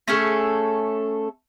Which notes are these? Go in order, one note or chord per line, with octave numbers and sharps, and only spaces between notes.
A3 C#4 G#4 A4